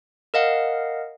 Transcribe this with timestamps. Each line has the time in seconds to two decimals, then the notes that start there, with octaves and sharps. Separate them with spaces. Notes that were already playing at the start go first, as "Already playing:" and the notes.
0.34 A#4 D#5 F5 F#5